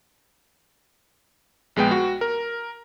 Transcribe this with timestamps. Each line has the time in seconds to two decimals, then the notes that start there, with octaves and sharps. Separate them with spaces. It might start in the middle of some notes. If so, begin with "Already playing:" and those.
1.76 A#1 G#3 B3 G5
1.91 F#4
2.21 A#4